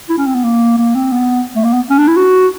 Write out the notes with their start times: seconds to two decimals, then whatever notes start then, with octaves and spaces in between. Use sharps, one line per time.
0.09 E4
0.17 C#4
0.26 C4
0.35 B3
0.44 A#3
0.78 A#3
0.95 C4
1.12 B3
1.56 A3
1.64 A#3
1.73 B3
1.90 C#4
1.98 D4
2.08 E4
2.16 F#4